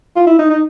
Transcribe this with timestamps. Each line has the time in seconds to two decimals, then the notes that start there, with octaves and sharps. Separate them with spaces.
0.16 F4
0.27 E4
0.39 D#4
0.50 D#4